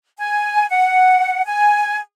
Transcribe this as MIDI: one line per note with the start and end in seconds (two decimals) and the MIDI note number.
0.18 0.68 80
0.70 1.42 78
1.46 1.98 80